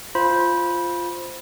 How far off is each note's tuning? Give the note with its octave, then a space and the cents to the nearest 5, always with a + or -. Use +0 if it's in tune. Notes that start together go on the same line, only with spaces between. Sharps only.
F4 +0 C5 +0 B5 -20